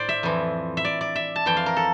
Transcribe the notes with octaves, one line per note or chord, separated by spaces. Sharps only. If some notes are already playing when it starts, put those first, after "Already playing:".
Already playing: A2 C5 D5
E5
F2 E3
E5
D5
D5
E5
A5
F2 E3 G5
F5
A#4
A4